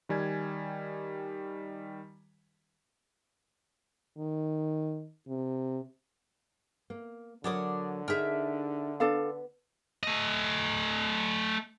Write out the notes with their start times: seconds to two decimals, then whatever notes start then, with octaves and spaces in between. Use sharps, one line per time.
0.09 D#3 G3 G#5 G#6
4.18 D#3
5.28 C3
6.90 A#3
7.44 D3 F#3 D4 A#4 C#5 D6 D#6
8.08 D4 D#4 G#4 A#4 E5
9.00 B3 D4 A4 F5
10.03 A3 D#5